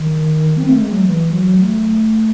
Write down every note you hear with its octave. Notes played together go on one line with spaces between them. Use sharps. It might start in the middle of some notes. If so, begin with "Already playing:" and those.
Already playing: D#3
C4
A3
G#3
F#3
E3
F#3
A3